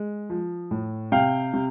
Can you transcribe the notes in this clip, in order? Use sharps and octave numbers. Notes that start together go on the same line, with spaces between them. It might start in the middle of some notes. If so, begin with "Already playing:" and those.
Already playing: G#3
F3
A2
C3 F5 G5
C3